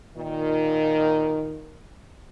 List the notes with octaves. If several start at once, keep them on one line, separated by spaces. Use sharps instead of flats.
A#2 D#3